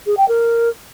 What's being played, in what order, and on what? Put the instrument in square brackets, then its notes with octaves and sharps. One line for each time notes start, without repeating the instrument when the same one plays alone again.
[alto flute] G#4
G5
A#4